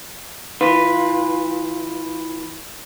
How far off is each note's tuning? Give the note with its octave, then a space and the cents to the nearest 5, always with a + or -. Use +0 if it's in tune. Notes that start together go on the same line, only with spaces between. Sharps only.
E3 -30 F4 +0 B4 +0